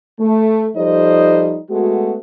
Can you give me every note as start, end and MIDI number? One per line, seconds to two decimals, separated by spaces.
0.19 0.67 57
0.76 1.58 53
0.76 1.58 55
0.76 1.58 63
0.76 1.58 69
0.76 1.58 72
0.76 1.58 75
1.70 2.18 56
1.70 2.18 57
1.70 2.18 59
1.70 2.18 66